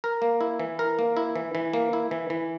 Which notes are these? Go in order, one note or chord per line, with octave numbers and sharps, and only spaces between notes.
A#4
A#3
E4
E3
A#4
A#3
E4
E3
E3
A#3
E4
E3
E3